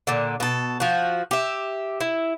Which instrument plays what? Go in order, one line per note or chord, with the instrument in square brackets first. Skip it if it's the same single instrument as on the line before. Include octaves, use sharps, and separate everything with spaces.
[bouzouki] A#2 D3
B2 A4
F3 F#4
G4 E5
E4